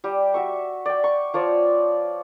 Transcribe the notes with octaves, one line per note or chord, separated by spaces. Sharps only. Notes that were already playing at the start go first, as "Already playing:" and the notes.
G3 G4
F#4 E5 C#6
D5 G5
C#6
F3 C#5 D5